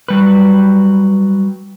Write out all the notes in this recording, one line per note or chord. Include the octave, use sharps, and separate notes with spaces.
F#3 G3 B4